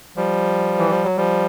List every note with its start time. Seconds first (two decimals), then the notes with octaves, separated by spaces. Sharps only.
0.17 F3 G3
0.78 E3
0.91 F3
1.04 F#3
1.17 F3 G3